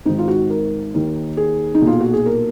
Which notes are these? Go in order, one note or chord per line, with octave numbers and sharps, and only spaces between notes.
G#1 G#2 D#3 D#4
F4
F#4
A#4
D#2 D#3
G#4
D#4
B1 A#2
F4
F#4
G#4
A#4